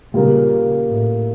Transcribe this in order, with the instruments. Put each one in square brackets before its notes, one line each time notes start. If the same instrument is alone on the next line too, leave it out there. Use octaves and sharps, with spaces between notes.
[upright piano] A#2 G3 A#3 [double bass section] C#3
[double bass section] A2